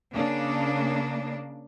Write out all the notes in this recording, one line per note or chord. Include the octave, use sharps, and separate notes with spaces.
C#3 A#3 D4